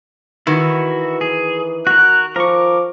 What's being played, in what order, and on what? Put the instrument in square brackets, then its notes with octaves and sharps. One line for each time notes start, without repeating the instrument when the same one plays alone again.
[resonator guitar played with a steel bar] D#3 [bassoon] E3 [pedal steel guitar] E4 F#4
[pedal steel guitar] G#4
[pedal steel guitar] F#4 A#4 [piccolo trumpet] F#6
[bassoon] F3 [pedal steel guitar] A#4 C#6 [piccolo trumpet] D6